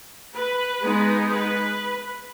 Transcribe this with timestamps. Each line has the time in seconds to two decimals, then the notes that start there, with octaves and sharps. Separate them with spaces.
0.35 B4
0.83 G#3 B3 D#4
1.30 B4